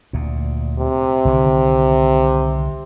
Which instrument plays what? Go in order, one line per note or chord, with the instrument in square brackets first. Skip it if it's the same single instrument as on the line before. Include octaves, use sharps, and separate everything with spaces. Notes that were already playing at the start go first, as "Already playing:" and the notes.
[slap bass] D2 A#2
[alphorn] C3
[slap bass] C2 D3 D#3